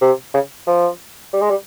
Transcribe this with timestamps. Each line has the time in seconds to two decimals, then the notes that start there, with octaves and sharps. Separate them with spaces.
0.01 C3
0.34 C#3
0.67 F3
1.34 G3
1.41 G#3
1.50 G3